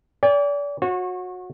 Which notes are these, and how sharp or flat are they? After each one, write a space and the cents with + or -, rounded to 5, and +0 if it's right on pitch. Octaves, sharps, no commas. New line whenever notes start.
D5 -35 G5 +45
F#4 -25 C#5 -35